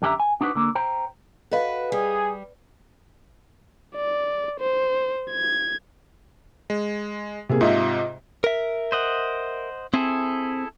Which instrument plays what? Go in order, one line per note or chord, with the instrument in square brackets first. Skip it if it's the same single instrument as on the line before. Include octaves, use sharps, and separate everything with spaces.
[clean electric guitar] F#2 D3 G4 A4 E5 A#5
G#5
D4 D#4 F#4 A4 B4 C5
D3 A#3
C5 G5 A#5
[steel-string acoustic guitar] F#4 B4 [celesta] A4 D#5 F5
[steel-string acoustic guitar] G3 [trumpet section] G#4
[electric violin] D5
C5
G#6
[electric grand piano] G#3
[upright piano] C3 A#3 G#4
[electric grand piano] G#2 C3 [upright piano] F4 D#5 E5
[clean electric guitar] A#4 E5
[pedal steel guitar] C5 D#5 F#5
[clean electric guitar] C4 [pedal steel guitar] E4 G#4 A4